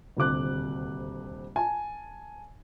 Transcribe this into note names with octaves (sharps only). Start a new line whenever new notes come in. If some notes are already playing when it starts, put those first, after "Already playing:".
D#1 D2 C3 D6 F#6
G#5 A5